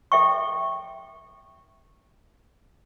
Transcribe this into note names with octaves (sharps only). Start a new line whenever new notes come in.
A4 E5 G5 C#6